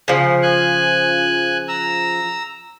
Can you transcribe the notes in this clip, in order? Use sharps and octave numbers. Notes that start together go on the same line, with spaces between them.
C#3 F3
G#5 F#6
A#5 E6